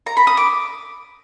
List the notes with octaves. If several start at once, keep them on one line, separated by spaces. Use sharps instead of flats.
A#5
B5
D#6
D6